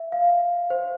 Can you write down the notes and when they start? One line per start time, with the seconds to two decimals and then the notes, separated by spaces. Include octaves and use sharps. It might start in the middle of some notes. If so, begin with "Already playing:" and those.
Already playing: E5
0.12 F5
0.70 C5